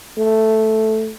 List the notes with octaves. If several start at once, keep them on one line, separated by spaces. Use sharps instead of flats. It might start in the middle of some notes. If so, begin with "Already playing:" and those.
A3